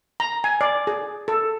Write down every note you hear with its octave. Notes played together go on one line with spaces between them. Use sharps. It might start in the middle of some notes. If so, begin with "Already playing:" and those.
A#5
G#5
D5
G#4
A4